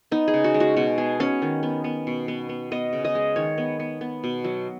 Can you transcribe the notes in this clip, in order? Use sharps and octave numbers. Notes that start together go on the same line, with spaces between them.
B3 D#4
G#4
C#3
F#4
G#3
F#4
B2 F#4
B3 G#4
B3 C#4
D#3
B3
B3
B2
B3
B3
B3 D#5
C#3
D#5
G#3
D#3 C#5
B3
B3
B3
B2
F#3